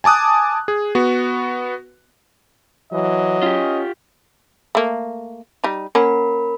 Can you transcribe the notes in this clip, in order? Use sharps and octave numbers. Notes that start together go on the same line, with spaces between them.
G#5 A5 D6 D#6 F#6
G#4
B3 F#4
E3 F#3 D#5
C#4 F4 G4
A3 A#3
G3 D#4
A#3 C#4 A#4 F#5 B5